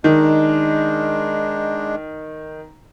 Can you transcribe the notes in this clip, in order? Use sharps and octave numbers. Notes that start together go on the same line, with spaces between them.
D#3 G#3 D4